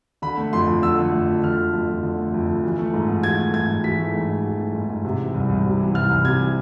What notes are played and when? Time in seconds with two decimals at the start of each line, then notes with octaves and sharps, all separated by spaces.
0.22 D3 B5
0.37 A3
0.53 F2 C6
0.68 F2
0.83 D3 E6
0.98 A3
1.13 F2
1.28 F2
1.43 D3 F6
1.58 A3
1.74 F2
1.89 F2
2.03 D3
2.19 A3
2.34 F2
2.48 F2
2.63 E3
2.79 A3
2.94 G#2
3.09 G#2
3.23 E3 G#6
3.38 A3
3.54 G#2 G#6
3.69 G#2
3.84 E3 B6
3.99 A3
4.14 G#2
4.29 G#2
4.44 E3
4.60 A3
4.75 G#2
4.90 G#2
5.05 C3
5.20 E3
5.34 C2
5.49 C2
5.65 C3
5.80 E3
5.94 C2 F6
6.10 C2
6.24 C3 G#6
6.39 E3